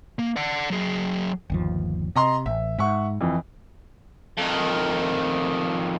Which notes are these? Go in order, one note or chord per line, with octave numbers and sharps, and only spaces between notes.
A#3
D5 F#5
F#3 G#4
G1 D#2 F3
C3 D#5 A#5 C6
A1 E5
G#2 E5 F#5 C#6
F2 E3
F2 D#3